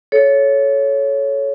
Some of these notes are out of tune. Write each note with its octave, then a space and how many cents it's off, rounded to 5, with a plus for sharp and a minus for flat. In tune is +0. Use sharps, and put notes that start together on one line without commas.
A4 -20 C#5 +0